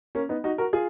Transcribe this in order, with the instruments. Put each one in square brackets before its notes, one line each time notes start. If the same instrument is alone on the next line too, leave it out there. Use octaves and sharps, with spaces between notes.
[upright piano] A#3 C#4
B3 D#4
D#4 F#4
F#4 A#4
F4 G#4